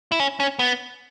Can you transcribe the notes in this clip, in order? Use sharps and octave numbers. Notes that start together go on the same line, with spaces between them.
E4
C#4
C#4
B3